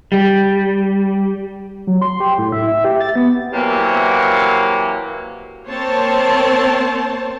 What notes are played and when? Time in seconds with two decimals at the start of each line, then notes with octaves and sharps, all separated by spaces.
0.12 G3
1.87 F#3
2.02 C6
2.20 G4
2.38 A2
2.52 E5
2.67 E5
2.84 G4
3.01 A6
3.16 B3
3.54 C3 E3 F#3 A#3
5.69 A#3 C4 C5 C#5 A5